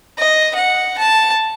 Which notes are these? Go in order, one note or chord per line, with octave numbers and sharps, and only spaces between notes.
D#5
F#5
A5